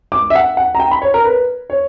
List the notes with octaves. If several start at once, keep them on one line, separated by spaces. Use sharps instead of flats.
D6
E5
F#5
F#5
A#5
G5
B5
C#5
A#4
B4
C#5